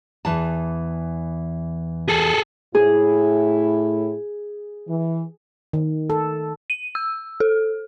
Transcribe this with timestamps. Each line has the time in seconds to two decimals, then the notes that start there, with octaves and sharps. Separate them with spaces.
0.25 E2 E3 A5
2.09 G#4 A4
2.75 A2 E4 G#4
4.87 E3
5.73 D#3
6.10 A4
6.70 D#7
6.95 E6
7.40 A4